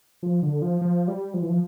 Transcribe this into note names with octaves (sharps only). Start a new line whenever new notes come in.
F3
D3
F3
F3
G3
F3
E3
F3